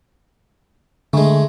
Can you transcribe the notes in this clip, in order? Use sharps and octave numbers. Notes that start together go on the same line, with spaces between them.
D3 G#3 A3